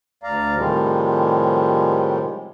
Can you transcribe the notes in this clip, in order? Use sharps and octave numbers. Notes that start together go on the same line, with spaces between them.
D2 D5 F5 A#5
A2 C3 D#3 F3 G3 G#3